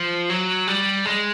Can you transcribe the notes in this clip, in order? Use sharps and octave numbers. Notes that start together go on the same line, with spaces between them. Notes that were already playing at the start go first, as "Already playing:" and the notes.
Already playing: F3
F#3
G3
G#3